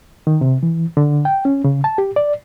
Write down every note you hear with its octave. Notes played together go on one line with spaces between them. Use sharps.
D#3
C3
E3
D3
G5
C#4
C#3
A5
G4
D5